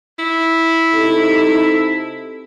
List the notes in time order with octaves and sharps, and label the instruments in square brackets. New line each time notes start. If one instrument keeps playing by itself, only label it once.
[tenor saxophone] E4
[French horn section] C3 D#4 A4